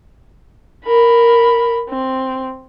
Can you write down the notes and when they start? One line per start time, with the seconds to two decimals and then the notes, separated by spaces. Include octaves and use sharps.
0.85 A#4 B5
1.90 C4